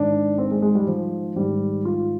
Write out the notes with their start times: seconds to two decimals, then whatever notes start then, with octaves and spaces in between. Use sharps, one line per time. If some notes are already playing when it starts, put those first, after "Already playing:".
Already playing: G#2 D#3 D4
0.38 C4
0.51 G#3
0.62 G#3
0.75 G3
0.87 F3
1.36 G#2 D#3 G3
1.85 F4